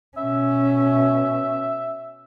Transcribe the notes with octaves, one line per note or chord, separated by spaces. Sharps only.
B2 C#4 E5